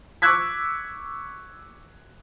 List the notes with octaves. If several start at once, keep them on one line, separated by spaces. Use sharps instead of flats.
C#6 D6 E6 F#6 G#6 B6